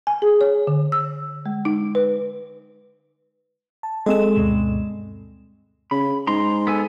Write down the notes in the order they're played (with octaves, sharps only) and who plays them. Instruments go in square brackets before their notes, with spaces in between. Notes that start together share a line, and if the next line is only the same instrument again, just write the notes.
[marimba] G#5
G#4
C#5
D3
E6
G#3
D#4
B4
[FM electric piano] A5
[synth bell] G#3 C4 E7 [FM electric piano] G#4 A4 D#5
[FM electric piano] D2 G2 B2
[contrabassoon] C#3 [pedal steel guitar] B5
[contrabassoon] G#2 [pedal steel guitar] A#5 C6
[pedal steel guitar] B3 A4 G#5